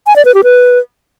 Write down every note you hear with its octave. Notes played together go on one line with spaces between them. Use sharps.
G#5
D5
B4
G4
B4